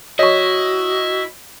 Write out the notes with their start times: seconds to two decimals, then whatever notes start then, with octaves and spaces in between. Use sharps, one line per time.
0.19 E4 F#4 C#5 D#5 C#6